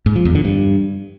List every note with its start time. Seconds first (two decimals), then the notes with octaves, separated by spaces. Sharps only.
0.06 G#2
0.16 F3
0.25 E2
0.35 D3
0.45 G2